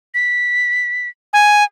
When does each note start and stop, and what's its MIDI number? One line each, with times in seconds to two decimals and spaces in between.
0.14 1.08 95
1.33 1.64 80